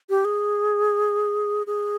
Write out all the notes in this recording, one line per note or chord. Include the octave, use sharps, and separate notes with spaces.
G4
G#4
G#4